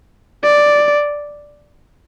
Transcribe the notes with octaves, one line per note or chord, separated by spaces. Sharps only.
D5